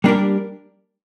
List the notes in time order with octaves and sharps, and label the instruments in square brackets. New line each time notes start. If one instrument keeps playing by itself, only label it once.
[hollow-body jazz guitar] G3 A#3 D4 G4 A#4